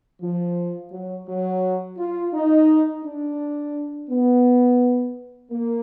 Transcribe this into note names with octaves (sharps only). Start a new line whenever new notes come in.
F3
F#3
F#3
F4
D#4
D4
B3
A#3